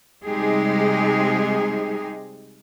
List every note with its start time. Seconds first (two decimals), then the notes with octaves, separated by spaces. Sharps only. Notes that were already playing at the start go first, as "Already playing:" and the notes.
0.24 C3 G3 G#3 D#4 G4 G#4